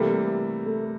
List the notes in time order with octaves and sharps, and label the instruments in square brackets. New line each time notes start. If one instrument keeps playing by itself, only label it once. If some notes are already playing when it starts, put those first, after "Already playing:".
Already playing: [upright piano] C3 E3 G3 A#3 [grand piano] A3
[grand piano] A3